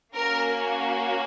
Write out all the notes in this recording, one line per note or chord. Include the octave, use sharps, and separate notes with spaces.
A#3 C#4 F#4 A#4